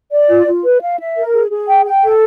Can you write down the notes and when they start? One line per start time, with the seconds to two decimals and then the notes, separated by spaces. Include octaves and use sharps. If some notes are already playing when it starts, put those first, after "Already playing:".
0.11 D5
0.29 F4
0.46 F4
0.64 B4
0.81 F5
0.98 E5
1.16 A#4
1.33 G#4
1.51 G#4
1.68 G5
1.85 G5
2.03 A4